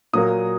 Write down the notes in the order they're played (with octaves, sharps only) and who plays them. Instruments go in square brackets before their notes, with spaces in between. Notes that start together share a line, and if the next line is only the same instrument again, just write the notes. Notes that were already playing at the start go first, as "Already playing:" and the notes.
[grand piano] A#2 F#3 A#3 D#6